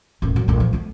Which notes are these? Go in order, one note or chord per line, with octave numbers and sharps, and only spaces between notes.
D#1 A2
A#2 F#3
A#1 A3
F3
A3 B3